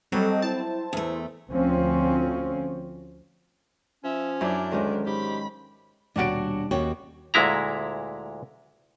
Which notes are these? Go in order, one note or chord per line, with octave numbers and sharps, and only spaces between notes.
F#3 G3 C4 A4 D#5
E4 C5 A5
E2 A3
D2 F3 C4 C#4
F3 C#4 E5
F#2 D4 E4 D5
D2 D#3 G#3 C#4
G#2 G4 B5
D#1 B2 G3 D4 F#4 C#5 D5 D7
D#2 C#4 F#4 G5
D2 A#2 G#3 E4 A#5